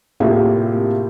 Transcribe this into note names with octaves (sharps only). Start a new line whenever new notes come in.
A2 C3 A#3 F4 G#4